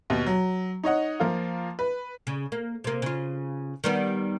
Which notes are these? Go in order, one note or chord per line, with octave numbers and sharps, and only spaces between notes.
D#2 B2
F#3
D#4 C#5 D#5 F#5
F3 A#3 F4
B4
C#3
A#3
C3 A#3
C#3 F4
D#3 G3 B3